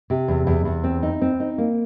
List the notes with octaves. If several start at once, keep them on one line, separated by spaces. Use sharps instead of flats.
C3
E2
E2
E2
C4
D#4
C4
D#4
A#3